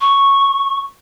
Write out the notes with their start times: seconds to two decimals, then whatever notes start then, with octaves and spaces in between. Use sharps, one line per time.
0.01 C#6